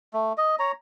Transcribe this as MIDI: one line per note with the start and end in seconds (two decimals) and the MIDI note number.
0.14 0.33 57
0.38 0.56 75
0.59 0.72 73
0.59 0.72 82